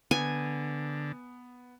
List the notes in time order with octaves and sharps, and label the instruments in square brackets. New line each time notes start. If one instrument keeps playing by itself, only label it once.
[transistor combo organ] D3 [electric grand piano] B3 [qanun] G#5